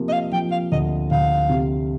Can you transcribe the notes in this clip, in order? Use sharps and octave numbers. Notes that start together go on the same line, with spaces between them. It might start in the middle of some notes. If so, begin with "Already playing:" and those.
Already playing: C3 F3 A#3
D#5
F5
F3 G5
F5
D2 D#5
D2 F5
C3